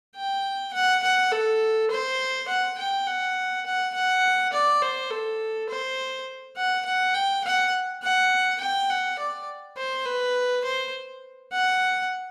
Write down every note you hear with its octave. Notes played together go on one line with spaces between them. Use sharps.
G5
F#5
F#5
A4
C5
F#5
G5
F#5
F#5
F#5
D5
C5
A4
C5
F#5
F#5
G5
F#5
F#5
G5
F#5
D5
C5
B4
C5
F#5